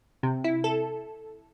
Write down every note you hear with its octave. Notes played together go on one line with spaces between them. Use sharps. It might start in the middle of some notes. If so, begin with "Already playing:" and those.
C3
E4
A4